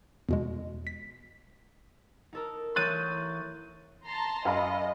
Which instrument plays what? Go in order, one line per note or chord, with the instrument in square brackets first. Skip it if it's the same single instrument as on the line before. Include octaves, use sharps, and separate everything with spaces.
[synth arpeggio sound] E2 B2 G#3
B6
[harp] D#4 A4 A#4
[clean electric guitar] E3 C#5 C6 [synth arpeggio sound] F#6 A6 D#7 [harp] G6
[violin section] A5 A#5 C6
[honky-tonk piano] F#2 F5 B5 [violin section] D#5